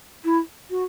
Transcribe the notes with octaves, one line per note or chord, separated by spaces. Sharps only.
E4
F#4